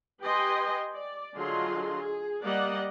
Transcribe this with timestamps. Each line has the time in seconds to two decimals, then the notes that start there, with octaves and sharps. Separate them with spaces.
0.22 G4 B4 D#5 G5 G#5 C6
0.94 D5
1.36 D3 F#3 F4 G#4 D#5 C6
1.98 G#4
2.43 G3 A#3 G4 D5 D#5 F#5